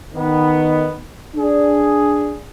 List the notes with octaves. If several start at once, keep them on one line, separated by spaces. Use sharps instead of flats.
D#3 B3
D4 G#4